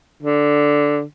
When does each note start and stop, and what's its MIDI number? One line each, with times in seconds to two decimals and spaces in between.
0.22 1.02 50